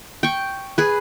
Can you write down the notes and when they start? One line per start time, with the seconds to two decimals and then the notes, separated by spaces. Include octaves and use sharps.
0.23 G5 C#6
0.78 G#4 B4